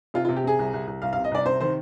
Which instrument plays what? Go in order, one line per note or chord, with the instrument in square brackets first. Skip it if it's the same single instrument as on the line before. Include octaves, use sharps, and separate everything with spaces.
[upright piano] C3 F4
F4
C3
G4
C3 G#4
C2
C2
C2
C2 F5
F5
C3
D#5
C2 D5
C3 C5
D#3 C5